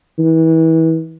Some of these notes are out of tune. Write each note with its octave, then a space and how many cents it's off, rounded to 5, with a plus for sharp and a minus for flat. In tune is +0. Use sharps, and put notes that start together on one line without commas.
E3 -30